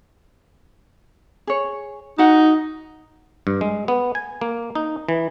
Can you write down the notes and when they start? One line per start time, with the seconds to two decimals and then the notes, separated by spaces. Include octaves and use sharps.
1.47 G#4 C#5
2.18 D#4 F#4 F#5
3.47 G2
3.61 G#3
3.88 B3
4.15 G#5
4.41 A#3
4.75 D#4
5.09 E3